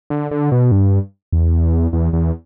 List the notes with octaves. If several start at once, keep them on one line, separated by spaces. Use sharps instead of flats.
D3
D3
B2
G2
E2
E2
E2